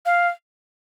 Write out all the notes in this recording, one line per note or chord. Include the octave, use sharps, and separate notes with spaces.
F5